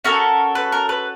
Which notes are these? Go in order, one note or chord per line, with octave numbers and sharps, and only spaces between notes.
C#4 F#4 A4 A#4
B4
A#4
B4